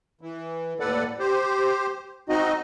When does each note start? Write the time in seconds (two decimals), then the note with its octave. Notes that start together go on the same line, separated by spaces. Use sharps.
0.21 E3
0.80 D#2 A2 A4 B4 D5 F#5
1.19 G4 C5
2.29 C4 D#4 F#4 D#5